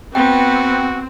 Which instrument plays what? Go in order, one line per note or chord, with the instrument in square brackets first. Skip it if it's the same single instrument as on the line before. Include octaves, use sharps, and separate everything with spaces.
[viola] B3 [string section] C4 [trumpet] F#4 [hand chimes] G5